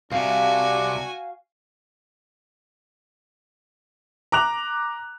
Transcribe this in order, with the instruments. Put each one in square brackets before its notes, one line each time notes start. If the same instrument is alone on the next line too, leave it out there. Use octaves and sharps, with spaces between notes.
[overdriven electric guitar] C2 C3 [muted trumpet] D4 [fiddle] F#4 G#5 [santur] F5
[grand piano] A#5 D6 F#6 F7